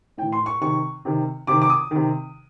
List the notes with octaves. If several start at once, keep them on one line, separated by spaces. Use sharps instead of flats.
A2 E3 G5
C6
C#6
C3 D#3 C#6
C3 D#3
C3 D#3 D6
D6
D#6
C3 D#3